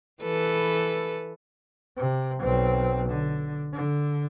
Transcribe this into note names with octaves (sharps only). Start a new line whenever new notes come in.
E3 A4 B4
C3
B1 C4
D3
D3